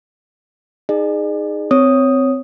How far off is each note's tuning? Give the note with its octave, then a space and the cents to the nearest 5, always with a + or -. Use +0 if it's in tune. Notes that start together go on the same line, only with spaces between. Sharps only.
D#4 +0 G#4 +0 D5 +45
C4 -20 C#5 +0 D#6 +0